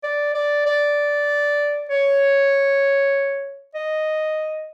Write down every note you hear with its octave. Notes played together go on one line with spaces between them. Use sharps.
D5
D5
D5
C#5
D#5